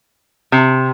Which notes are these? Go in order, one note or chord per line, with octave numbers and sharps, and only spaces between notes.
C3